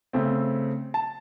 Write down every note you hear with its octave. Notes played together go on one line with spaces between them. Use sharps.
C#3 A3 C4
A5